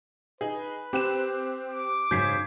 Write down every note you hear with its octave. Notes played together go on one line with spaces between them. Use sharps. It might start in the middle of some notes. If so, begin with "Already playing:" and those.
D#4 G#4 B4
C4 G4 F#6 E7
D6
G#2 C#3 F#3 G6 G#6 B6 C7